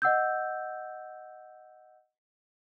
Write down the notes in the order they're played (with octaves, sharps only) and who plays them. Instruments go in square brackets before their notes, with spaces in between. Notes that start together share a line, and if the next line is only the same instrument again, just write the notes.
[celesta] D#5 F#5 E6 G6